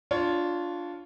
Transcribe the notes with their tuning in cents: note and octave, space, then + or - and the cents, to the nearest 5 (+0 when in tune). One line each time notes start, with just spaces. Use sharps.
D4 +0 F4 +0 C#5 +20